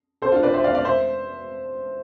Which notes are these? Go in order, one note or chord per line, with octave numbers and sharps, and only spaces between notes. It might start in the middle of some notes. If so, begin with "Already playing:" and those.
A4 C5
D4 F4
B4 D5
C5 E5
D5 F5
D5 F5
C5 E5